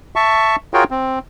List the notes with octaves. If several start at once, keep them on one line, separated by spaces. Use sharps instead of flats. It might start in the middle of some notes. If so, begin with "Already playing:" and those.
E5 A5 C#6
F4 F#4 G#4 A#4 C#5 G5
C4